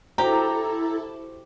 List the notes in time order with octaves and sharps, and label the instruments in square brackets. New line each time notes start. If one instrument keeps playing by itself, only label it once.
[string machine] E4 A4 [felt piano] F#4 C5 [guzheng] G4 [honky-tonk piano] A#5